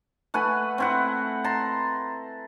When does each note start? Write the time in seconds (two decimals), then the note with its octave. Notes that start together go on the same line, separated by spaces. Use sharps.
0.34 A3 B4 F#5 G#5
0.78 C4 E4 F#5
1.44 A5 A#5 C6